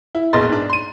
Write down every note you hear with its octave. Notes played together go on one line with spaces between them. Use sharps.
E4
E1 A#1 B2 D#5 C6 A6
G#2 D4
C6 D#7